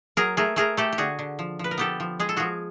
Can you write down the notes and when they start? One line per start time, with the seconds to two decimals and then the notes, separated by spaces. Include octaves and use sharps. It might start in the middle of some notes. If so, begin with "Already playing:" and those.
0.17 F#3 G#4 A#4
0.37 A3 G#4 A#4
0.56 A3 G#4 A#4
0.77 A3 G4 A4
0.92 G4
0.98 D3 F#4 G#4
1.19 D3
1.39 F3
1.59 F3 B4
1.71 A#4
1.77 B3 G4 A4
2.00 F3
2.20 G#3 G#4
2.29 A4
2.37 F3 F#4 G#4